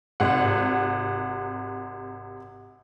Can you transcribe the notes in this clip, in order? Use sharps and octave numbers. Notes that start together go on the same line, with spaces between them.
G#1 C3 F#5